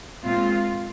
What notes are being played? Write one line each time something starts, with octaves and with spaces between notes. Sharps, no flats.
A#2 G#3 C4 F4